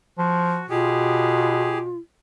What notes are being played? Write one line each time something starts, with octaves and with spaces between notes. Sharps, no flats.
F3 F#4
B2 F4 G4 G#4